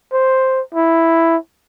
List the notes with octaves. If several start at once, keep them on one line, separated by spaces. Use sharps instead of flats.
C5
E4